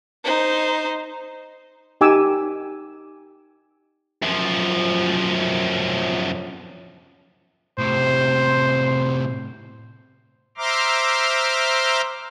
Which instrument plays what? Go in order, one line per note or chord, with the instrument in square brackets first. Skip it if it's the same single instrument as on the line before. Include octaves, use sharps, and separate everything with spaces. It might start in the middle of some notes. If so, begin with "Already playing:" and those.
[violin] D#4 C5
[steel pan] D#4 G4 G#5 D6 E6
[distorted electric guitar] F#2 F3
[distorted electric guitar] A2 C3 [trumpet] C5
[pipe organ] C5 E5 A#5 C6 D6 F6